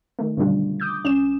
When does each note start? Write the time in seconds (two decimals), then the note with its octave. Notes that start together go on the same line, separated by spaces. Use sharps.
0.19 D#3 A3
0.37 F#2 B2 D3 G3 D4 F4
0.80 D6 D#6 G6
1.04 C2 C#4 E7